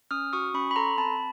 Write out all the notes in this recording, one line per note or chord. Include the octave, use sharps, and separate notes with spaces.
C#4 D#6 F6
F#4 C#6 D#6
C#4 B5 C#6
B5
A4 A#5 C6
C4 A5 B5